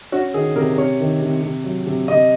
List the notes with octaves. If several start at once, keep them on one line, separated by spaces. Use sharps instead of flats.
C#4 F#4
D#3 G#4
C3 A#4
C3 C#5
D#3
C3
C3
F#3
C3
C3 D#5